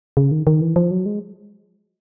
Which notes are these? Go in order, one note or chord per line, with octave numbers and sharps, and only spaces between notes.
C#3
D#3
D#3
E3
F3
F#3
G#3